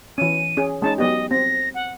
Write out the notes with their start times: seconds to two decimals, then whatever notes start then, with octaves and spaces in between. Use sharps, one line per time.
0.18 E3 C#4 D#7
0.57 C#4 G#4
0.82 G#3 C#4 D#4 A5
0.98 F#3 B3 G4 D#5
1.31 C4 A#6
1.75 F#5